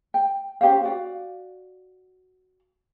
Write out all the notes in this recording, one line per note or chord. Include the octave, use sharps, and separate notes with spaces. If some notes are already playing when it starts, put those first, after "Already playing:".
G5
C#4 G4 C5 F5
F#4 D5 F5